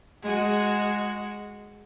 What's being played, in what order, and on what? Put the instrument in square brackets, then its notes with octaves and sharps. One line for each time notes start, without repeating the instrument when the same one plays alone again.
[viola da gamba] G#3 F#4